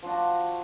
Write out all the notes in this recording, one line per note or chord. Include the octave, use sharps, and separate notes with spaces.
F3 D4 F#4